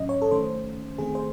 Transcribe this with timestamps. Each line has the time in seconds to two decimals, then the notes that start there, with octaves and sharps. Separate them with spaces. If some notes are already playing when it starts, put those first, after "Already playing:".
Already playing: A2 F#3 C#4 D#5
0.09 C#5
0.22 A4
0.31 D#3 A3 C#4 C5
0.98 D#3 A3 C4 G#4
1.15 C5